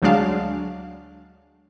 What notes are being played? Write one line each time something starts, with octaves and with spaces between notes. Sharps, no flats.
D2 F#3 G#3 D4 F5